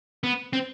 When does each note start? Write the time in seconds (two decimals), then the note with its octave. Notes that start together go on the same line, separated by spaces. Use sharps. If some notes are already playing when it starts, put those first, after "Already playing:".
0.24 B3
0.53 C4